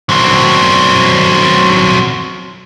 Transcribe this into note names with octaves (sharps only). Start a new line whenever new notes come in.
F#3 C4